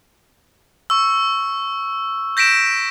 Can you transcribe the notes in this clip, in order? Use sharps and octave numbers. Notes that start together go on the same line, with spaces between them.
C#6 E6
G6 A#6 B6 D7 E7